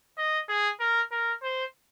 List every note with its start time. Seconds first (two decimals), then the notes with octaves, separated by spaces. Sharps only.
0.18 D#5
0.49 G#4
0.80 A#4
1.11 A#4
1.42 C5